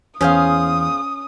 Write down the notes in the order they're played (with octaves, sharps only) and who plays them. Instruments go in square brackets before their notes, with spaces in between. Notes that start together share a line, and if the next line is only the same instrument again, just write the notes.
[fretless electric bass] E2 [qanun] C#4 [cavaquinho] G#4 C5 F5 [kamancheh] D#6